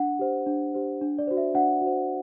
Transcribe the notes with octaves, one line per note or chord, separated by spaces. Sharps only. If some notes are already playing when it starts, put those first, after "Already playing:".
Already playing: D4 F#5
G4 C5
D4
G4 C5
D4
D5
F#4 C5
E5
D4 F#5
F#4
C5